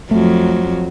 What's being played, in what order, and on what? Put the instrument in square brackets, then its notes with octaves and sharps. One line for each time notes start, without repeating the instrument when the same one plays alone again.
[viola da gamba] F2 F#3 [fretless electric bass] A3